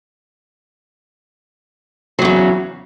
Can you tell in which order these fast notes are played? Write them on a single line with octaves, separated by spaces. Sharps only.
F#3 E2 C#3